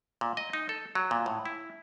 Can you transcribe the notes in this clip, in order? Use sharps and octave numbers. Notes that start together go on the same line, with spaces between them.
A#2
D#5
D#4
A4
F#3
A#2
A2
E4